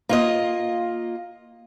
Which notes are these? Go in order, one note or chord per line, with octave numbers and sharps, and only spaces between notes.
A#3 F4 D#5